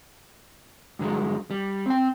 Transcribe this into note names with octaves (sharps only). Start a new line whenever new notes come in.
G2 D3 F#3 G#3
G3
C4 G5